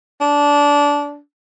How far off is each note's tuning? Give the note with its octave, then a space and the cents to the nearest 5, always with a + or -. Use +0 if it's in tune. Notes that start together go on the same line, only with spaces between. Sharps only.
D4 -20